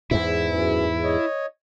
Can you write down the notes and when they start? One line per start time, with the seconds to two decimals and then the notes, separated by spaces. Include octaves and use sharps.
0.11 E2 G#2 E4
0.49 F#2 E3
1.03 C#5 D#5